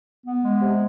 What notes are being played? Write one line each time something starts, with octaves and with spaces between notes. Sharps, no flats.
B3
G#3
C3